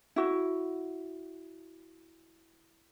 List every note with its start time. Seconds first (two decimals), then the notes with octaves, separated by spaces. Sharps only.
0.16 E4 F#4